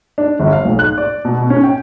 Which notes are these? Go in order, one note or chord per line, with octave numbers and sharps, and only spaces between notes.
D4
G1
F5
B1
F#6
D5
B2
B2
C#4
G5